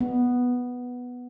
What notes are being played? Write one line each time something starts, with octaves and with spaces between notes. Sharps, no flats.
B3